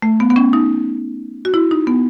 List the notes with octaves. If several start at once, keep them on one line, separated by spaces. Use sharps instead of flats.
A3
B3
B3
C#4
D#4
F#4
E4
D#4
B3